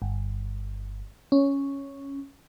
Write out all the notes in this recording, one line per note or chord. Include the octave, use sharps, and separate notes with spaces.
G1
C#4